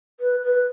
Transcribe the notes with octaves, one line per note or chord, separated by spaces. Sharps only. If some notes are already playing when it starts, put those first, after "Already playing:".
B4
B4